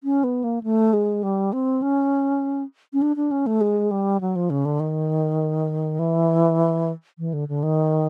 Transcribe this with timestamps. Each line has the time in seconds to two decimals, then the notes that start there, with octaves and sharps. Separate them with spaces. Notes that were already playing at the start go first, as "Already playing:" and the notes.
0.04 C#4
0.24 B3
0.44 A#3
0.63 A3
0.93 G#3
1.23 G3
1.53 C4
1.82 C#4
2.93 C#4
3.02 D4
3.16 D4
3.31 C#4
3.47 A3
3.61 G#3
3.91 G3
4.21 F#3
4.36 F3
4.50 C#3
4.65 D3
4.80 D#3
5.99 E3
7.19 E3
7.33 D3
7.49 D3
7.63 D#3